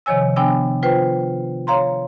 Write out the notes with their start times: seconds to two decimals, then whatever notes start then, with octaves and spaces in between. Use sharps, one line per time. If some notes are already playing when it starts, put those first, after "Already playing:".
0.06 C3 D#3 F3 C#5 G#5 E6
0.36 B3 D4 G5 G#5 E6
0.83 F4 B4 C5 G5
1.67 C#5 F5 A#5 C6